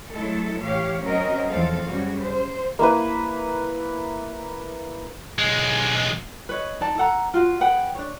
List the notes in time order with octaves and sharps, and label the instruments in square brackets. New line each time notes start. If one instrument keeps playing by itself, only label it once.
[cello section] F#3 G#3 A3 E4 A4
A2 E3 G4 C#5 F5
F#3 C4 C#4 F#4 A#4 D#5
E2 F3 G#3 C4 A4 F5
F#2 C#3 G3 F#4
C5
[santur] A#3 E4 B4
[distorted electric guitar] B1 G#3
[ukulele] B4 C#5 D#5
D#4 D5 A5
A4 F#5 A#5
F4 F#4 F5
G#4 B4 F#5 G5
D4 C#5